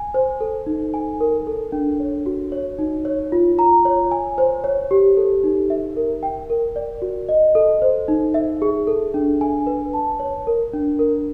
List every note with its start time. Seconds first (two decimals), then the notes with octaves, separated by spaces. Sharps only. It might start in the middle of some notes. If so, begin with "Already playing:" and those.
Already playing: G#5
0.14 C5
0.41 A4
0.66 D#4
0.94 G#5
1.20 A#4
1.47 A4
1.72 D4
2.00 C#5
2.26 F#4
2.52 C#5
2.79 D#4
3.05 C#5
3.32 F4
3.59 A#5
3.85 C#5
4.11 G#5
4.38 C5
4.64 C#5
4.91 G4
5.17 A4
5.44 D#4
5.70 E5
5.97 A#4
6.23 G5
6.50 A#4
6.76 D5
7.02 F#4
7.29 D#5
7.55 A4
7.82 C5
8.08 D#4
8.34 E5
8.62 G#4
8.87 A4
9.14 D4
9.41 G#5
9.67 B4
9.94 A5
10.20 C#5
10.47 A#4
10.73 D4
10.99 A#4